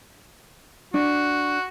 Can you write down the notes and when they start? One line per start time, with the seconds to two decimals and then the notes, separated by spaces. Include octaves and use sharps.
0.94 D4 F#4